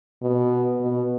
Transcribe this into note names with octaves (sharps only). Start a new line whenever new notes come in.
B2
B2